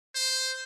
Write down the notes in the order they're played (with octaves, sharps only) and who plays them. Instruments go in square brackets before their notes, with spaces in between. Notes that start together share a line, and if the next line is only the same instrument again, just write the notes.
[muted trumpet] C5